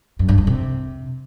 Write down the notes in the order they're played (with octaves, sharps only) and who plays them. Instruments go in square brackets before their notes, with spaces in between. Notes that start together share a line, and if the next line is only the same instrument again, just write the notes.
[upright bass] F#2
G2
F2
C3